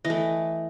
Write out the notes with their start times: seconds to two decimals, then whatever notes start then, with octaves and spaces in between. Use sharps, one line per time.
0.05 E3 D#5
0.10 A3